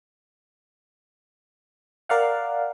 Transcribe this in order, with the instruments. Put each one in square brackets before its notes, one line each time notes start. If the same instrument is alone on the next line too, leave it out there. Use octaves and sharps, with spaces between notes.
[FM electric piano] A#4 D5 F5 F#5